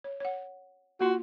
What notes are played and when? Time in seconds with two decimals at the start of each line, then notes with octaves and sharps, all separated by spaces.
0.04 C#5
0.20 C#5 F#5
1.01 A#3 F4 F#4 C6